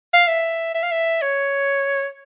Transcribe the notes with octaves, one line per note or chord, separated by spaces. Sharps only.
F5
E5
E5
F5
E5
C#5